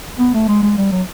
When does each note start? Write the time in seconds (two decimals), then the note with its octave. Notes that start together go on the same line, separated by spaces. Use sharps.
0.19 B3
0.34 A3
0.48 G#3
0.63 G#3
0.78 G3
0.92 F#3